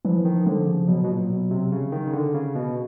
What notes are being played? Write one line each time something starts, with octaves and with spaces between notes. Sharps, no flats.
E3 F3
D#3
D3 F3
C#3
B2 F#3
B2
A#2
B2
C3
C#3
D#3
C#3
D3
C#3
B2